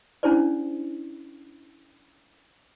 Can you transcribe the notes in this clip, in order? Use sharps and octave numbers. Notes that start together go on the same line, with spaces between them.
C#4 D4 E4 G#4 C5 D5